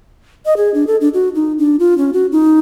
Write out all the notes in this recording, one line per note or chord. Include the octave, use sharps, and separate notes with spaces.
D#5
G#4
D4
A4
D4
F#4
D#4
D4
F4
C#4
F#4
D#4